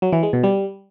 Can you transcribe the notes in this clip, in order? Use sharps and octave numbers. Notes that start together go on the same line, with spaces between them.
F#3
E3
G#3
B2
G3